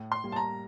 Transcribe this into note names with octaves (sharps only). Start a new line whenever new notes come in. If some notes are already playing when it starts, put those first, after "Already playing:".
Already playing: A2
C6
G3 A#3
A5
A#5